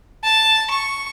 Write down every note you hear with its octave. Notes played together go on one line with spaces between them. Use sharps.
A5
C#6